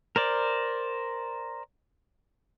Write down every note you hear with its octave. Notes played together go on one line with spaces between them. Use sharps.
A#4 C5 D5